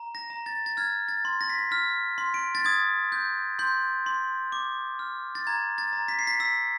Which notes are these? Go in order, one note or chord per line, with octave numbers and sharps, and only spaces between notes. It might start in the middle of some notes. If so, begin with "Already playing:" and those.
Already playing: A#5
A#6
A#5
A6
A6
F6 G#6
A6
C6
A#6
B6
A#6
F6 B6
C6
D7
A6
D#6 G#6
G6
C6 G6
C6
D6
F6
A6
A#5 G#6
A6
A#5
B6
C7
B6
E6 B6